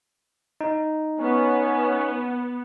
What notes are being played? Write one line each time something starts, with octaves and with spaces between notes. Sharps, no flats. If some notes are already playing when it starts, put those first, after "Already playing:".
D#4
B3 C#4